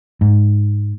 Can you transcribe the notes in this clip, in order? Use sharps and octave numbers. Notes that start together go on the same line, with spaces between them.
G#2